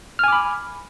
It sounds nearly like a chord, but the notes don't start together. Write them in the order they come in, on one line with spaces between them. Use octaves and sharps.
F6 G#5 D6 B5